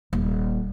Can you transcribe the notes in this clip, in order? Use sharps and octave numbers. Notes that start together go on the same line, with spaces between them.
D#1